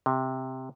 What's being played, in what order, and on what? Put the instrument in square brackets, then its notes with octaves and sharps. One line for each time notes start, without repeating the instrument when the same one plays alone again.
[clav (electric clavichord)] C3